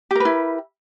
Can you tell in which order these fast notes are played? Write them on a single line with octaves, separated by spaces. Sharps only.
G4 A#4 B4 E4